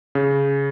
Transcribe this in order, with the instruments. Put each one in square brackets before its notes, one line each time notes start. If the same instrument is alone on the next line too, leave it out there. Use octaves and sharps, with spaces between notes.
[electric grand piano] C#3